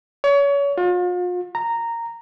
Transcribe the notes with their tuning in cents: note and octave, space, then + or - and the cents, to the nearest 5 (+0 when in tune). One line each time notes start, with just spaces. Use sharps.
C#5 +30
F4 +40
A#5 -10